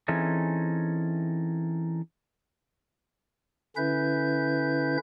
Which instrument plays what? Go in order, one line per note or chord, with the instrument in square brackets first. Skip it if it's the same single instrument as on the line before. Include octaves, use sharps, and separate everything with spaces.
[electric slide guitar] E3 C4 C#4 D#4 G#4 A4
[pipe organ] D3 C#4 E4 B4 E5 G6